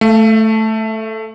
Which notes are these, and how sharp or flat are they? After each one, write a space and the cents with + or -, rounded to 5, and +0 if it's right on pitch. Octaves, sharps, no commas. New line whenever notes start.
A3 +0 F5 -40